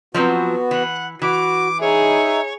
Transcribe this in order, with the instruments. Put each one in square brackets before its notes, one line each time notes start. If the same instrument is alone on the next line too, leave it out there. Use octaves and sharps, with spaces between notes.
[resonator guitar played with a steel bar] F3 F#3 C4 [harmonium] B3 F#4
[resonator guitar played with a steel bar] E3 [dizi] F#5
[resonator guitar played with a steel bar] E3 [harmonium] F#4 [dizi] D6
[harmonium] D#4 E5 [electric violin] G#4 [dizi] C#5